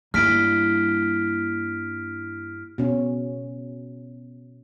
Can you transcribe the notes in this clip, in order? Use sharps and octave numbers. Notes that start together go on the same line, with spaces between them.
G2 A#3 E4 F6 B6 D7
B2 C#4